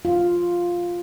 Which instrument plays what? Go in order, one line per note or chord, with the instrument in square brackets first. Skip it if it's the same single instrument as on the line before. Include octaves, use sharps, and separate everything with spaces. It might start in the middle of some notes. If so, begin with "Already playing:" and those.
[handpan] F4